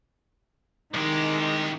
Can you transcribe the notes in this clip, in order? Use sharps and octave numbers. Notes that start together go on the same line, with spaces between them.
C2 D#3 G#3 G4